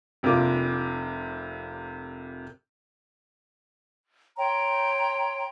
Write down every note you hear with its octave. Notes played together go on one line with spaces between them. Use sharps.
F1 C3 A#3 D4 F4 D6
C#5 G5 A#5 C6